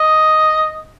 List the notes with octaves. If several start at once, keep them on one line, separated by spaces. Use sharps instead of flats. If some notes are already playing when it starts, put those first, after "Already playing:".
Already playing: D#5